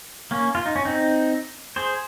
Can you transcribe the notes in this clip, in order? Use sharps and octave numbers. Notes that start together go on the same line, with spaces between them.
A#3 C#4
F4
D#4
C#4
C4 D#4
G#4 C5